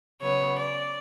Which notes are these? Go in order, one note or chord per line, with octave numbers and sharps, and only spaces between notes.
C#3 F#3 B3 C#5
D5